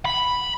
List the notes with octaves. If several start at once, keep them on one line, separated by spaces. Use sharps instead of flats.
B5